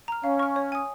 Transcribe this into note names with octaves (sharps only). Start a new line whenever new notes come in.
A#5 F6
C#4 F5
C#6 F6
C#5
G#5 D#6